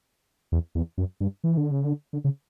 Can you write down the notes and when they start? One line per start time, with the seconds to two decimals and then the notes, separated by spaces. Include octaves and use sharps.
0.52 E2
0.75 E2
0.98 F#2
1.20 G2
1.44 E3
1.57 D3
1.71 C#3
1.84 D3
2.13 D3
2.24 C#3